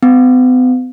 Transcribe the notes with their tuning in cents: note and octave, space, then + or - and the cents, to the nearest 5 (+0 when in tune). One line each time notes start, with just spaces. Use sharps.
B3 +45